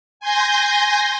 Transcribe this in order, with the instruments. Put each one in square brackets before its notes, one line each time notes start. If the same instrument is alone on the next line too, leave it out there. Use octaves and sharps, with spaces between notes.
[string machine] G#5 C6 G6 A#6